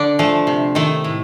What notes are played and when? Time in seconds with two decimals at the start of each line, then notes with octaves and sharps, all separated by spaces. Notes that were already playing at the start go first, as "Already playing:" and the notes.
Already playing: D3 D4
0.19 F3 A3
0.47 C3
0.75 D#3 A3
1.04 A2